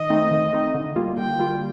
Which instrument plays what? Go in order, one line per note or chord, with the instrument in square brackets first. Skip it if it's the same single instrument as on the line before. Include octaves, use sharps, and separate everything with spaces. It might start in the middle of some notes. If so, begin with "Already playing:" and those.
Already playing: [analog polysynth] D#3 [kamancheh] D#5
[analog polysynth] A3 C4 D#4
D#3
A3 C4 D#4
D3
G3 A#3 F4
[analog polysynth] D3 [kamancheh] G5
[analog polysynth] G3 A#3 F4